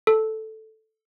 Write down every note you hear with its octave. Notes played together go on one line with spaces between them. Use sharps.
A4